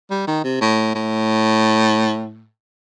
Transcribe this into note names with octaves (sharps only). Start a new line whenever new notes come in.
G3
D#3
C3
A2
A2